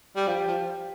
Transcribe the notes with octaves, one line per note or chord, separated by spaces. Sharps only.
G3
F3 G4
F3